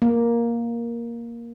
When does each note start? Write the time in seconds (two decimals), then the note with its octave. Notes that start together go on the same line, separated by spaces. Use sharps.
0.02 A#3